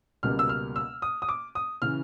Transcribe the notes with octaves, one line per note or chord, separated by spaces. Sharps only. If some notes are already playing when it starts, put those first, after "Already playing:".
C#2 B2 G3 A#3 F6
E6
F6
E6
D#6
D#6
D6
D#6
C#3 E3 F6